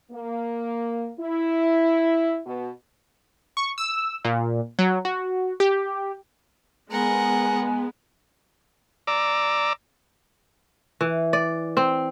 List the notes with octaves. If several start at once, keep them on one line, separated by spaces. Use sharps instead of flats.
A#3
E4
B2
C#6
E6
A#2
F#3
F#4
G4
G#3 B3 A#4 F#5 G#5
D5 A#5 D6 E6
E3
D5
C4